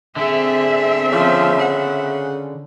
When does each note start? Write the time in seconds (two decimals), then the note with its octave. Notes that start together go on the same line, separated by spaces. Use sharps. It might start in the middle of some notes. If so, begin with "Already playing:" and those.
0.16 D3 C4 G#4 E5
1.12 C#3 F3
1.60 F#5